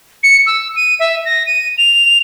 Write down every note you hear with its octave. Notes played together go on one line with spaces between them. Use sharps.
C#7
E6
D#7
E5
A#6
D#7
F7